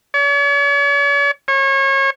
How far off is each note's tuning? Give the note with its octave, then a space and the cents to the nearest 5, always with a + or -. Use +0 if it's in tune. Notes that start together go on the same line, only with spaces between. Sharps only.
C#5 +45
C#5 -30